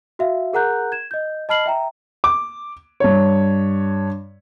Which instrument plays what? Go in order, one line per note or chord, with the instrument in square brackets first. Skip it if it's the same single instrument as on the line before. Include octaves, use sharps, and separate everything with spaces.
[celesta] F#4 E5 F5
G#4 A#4 F#5 A#5 F#6 G6
G#6 E7
D#5 G6
D#5 A5 B5 F6 C7 F#7
E5 G5 A#5
[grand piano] D6
G2 C#5